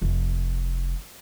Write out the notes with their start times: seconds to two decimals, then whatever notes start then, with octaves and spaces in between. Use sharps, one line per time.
0.02 F1